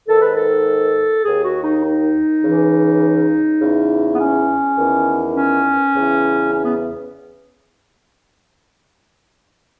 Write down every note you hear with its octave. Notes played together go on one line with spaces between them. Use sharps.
G#2 D#3 A4
B4
A4
D#2 D#3 G#4
F#4
D#4
D#4
C#2 C#3 E3
E2 C#3 E3
B3
C#4
E2 D#3
C#4
E2 C#3 E3
C#4
B3